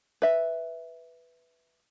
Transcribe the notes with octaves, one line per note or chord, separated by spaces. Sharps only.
B4 E5